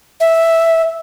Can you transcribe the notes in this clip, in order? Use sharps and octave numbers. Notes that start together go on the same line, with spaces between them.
E5